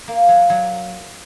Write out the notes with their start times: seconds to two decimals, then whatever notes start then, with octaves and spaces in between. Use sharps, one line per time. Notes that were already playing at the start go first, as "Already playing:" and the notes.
0.08 A#3
0.29 F#3
0.50 F#3